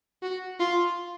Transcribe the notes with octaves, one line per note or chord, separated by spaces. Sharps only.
F#4
F4